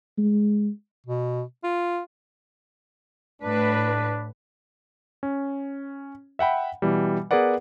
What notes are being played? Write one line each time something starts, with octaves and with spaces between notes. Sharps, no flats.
G#3
B2
F4
A2 D4 B4
C#4
E5 F#5 G5 B5
B2 E3 G3
B3 G#4 A#4 B4 D5 F#5